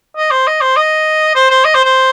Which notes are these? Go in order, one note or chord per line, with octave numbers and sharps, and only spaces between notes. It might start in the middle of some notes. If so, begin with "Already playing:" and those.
D#5
C5
D#5
C5
D#5
C5
C5
D#5
C5
C5